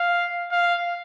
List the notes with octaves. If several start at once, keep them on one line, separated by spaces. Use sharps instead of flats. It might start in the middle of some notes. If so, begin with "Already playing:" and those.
Already playing: F5
F5